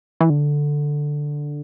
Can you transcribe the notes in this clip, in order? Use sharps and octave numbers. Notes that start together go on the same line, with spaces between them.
E3
D3